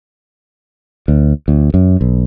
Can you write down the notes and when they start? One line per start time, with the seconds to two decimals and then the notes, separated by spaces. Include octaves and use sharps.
1.08 D2
1.48 D2
1.74 F#2
2.01 B1